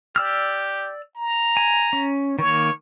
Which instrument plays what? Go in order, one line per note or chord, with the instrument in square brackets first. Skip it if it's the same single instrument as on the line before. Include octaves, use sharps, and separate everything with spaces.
[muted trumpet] G4 [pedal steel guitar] D5 E6 F6
[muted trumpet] A#5
[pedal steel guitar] G#5
C#4
[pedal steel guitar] D#3 A#3 [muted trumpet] C#5